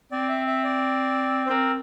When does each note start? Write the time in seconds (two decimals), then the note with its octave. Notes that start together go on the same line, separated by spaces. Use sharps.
0.12 C4 D5
0.29 E5
0.47 E5
0.64 D5
1.46 C5
1.50 C4 A#4